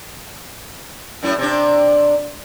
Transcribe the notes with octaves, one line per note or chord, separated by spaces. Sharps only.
F#2 A2 E4
C3 D4